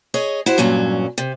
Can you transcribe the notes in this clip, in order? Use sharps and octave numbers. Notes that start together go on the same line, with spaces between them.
G#4 C#5 D#5
E4 F#4 C5
G2 A#2 F#3 C#4
C3